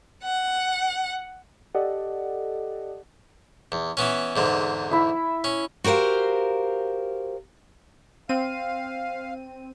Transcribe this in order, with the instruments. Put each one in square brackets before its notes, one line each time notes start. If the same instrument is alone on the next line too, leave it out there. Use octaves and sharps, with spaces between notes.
[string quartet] F#5
[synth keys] G4 A4 D5 D#5 F#5
[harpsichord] E2
E3 B3 C#4
E2 G#2 D3
[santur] E4 E5
[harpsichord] C#4
[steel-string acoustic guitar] F#4 G4 A#4 C5 F5
[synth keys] C4 D#7 [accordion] F5